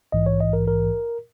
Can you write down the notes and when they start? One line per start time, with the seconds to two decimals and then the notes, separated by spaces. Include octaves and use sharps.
0.12 A#1 G#2 E3 D#5
0.26 C#5
0.41 D#5
0.53 A#4
0.68 A#4